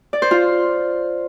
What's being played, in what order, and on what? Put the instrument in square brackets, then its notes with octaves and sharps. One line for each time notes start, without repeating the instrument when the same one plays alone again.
[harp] D5
C5
F4